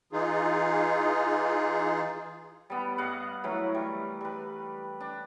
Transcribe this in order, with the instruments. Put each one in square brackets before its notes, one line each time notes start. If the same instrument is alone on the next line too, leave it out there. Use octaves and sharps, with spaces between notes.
[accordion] E3 D#4 F4 G#4
[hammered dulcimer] G3 B3
G2 D#5 F5 F#5
E3 F#3 A3 A#4
G3
G3 B4
D4